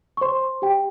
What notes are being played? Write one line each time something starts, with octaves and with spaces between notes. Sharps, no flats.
C#6
C5 C6
G4 G5